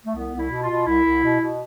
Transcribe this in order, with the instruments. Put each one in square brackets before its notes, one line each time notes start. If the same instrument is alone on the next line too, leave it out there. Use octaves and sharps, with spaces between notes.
[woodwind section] A3
C2 B3
C2
E4
B2
F4
B2
C2 E4
C2
B2
B2